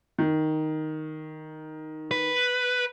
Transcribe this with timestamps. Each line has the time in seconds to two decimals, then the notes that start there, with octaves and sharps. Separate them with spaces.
0.18 D#3
2.11 B4